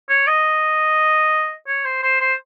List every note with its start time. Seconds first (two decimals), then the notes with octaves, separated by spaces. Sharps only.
0.09 C#5
0.27 D#5
1.67 C#5
1.85 C5
2.03 C5
2.20 C5